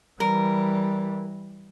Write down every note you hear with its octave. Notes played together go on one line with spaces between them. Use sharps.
E3 G3 A#4